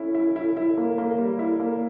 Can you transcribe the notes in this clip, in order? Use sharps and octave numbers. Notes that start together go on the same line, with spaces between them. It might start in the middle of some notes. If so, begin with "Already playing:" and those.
Already playing: C#4 E4
E4
E4
E4
A#3
A#3
G3
E4
A#3